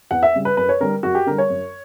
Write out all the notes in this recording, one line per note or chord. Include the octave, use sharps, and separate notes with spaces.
E2 F#5
E5
C#3 G3
B4
F#2 B4
C#5
D3 G3 A#4
F#2 F#4
G4
D3 G3 A#4
C#5
F#2